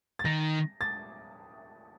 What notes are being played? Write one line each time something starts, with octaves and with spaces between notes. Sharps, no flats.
A6
D#3 A#6
A6